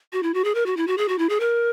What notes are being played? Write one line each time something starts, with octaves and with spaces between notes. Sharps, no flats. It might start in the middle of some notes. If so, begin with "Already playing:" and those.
F#4
E4
F#4
G#4
A#4
F#4
E4
F#4
G#4
F#4
E4
G#4
A#4